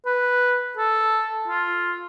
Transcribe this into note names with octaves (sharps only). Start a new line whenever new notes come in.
B4
A4
F4